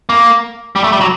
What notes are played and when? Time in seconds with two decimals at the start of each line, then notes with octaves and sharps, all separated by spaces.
0.09 A#3
0.76 G3
0.84 A3
0.92 G3
1.01 F#3